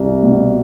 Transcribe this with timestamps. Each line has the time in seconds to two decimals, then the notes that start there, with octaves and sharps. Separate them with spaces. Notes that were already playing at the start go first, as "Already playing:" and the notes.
Already playing: C2
0.23 B2